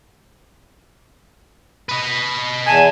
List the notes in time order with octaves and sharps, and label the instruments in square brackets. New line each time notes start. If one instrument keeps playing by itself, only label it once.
[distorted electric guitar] B4 D#5
[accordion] E2 [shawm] G#5 [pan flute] A5